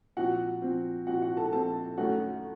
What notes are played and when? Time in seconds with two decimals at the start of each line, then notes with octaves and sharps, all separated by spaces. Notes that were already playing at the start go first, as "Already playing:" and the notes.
0.17 A#2 F3 C4 F#4 F#5
0.62 A#2 F3 C4
1.07 A#2 F3 C4 F#4 F#5
1.22 F#4 F#5
1.37 A4 A5
1.52 A#2 F3 C4 A4 A5
1.98 F#2 D#3 A3 C#4 F#4 F#5